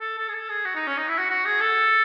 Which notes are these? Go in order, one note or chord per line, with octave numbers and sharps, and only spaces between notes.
A4
A4
G#4
A4
G#4
F#4
D#4
C#4
D#4
E4
F#4
F#4
G#4
A4